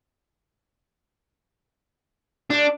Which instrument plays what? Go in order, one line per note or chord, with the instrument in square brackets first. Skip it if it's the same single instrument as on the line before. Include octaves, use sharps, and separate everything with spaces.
[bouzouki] G3 A3 [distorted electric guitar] D4